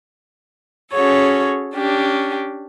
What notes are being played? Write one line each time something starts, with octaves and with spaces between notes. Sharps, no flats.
C#4 F#4 G#4 A4 C#5
C#4 D4 G4